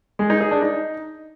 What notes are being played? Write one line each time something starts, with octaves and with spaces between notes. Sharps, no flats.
G#3
D#4
G#4
D4
D#4